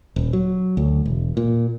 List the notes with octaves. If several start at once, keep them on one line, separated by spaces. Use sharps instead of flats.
D#1
F#3
D2
E1
A#2